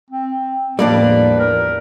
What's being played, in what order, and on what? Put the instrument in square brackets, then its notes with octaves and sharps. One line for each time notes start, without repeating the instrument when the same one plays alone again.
[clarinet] C4
[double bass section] E2 A2 F3 [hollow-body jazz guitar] G3 A#3 D4 [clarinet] B4 [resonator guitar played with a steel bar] D5
[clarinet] A#4